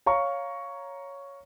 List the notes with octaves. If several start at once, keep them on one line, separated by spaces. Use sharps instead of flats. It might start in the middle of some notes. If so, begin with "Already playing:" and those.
C#5 F5 A#5 C#6